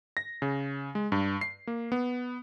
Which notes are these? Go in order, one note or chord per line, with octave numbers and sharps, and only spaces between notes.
A#6
C#3
G#3
G2
C7
A#3
B3